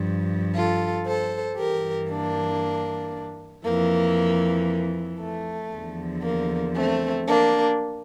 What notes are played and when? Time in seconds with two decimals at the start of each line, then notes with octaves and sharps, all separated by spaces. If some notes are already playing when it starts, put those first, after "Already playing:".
Already playing: G2 F3
0.55 F4 A4
1.06 A4 C5
1.58 G2 E3 G4 A#4
2.10 A#3 D4
3.64 F2 E3 A#3
5.20 A3
5.72 E2 D3 F3
6.23 A#3
6.74 A3 C4
7.26 A#3 D4